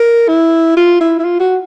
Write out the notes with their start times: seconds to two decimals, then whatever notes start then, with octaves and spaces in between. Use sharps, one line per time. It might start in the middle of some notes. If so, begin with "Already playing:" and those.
Already playing: A#4
0.28 E4
0.77 F4
1.00 E4
1.19 E4
1.25 F4
1.40 F#4